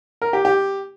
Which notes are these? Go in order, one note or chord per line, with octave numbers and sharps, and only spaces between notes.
A#4
G4
G4